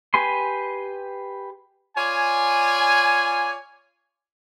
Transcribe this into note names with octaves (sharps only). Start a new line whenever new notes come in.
G4 B4 G#5 C6
F4 C#5 D5 G#5